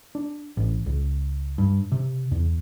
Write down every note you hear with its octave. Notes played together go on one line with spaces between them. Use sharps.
D4
A1
C#2
G2
C3
E2